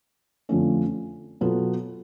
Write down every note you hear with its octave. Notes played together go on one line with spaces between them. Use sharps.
F2 D3 F3 A3 C#4
B2 F#3 B3 F4 A4